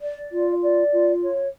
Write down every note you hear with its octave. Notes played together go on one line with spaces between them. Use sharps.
D5
F4
D5
F4
C#5